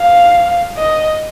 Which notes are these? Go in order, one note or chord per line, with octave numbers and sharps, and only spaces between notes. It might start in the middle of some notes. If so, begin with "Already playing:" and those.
Already playing: F5
D#5